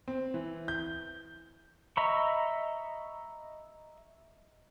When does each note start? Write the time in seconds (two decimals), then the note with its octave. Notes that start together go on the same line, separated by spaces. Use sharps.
0.08 C4
0.34 E3
0.68 G6
1.97 D#5 E5 A#5 B5 C#6